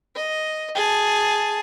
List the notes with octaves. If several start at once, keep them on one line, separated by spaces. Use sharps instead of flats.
D#5
G#4 A5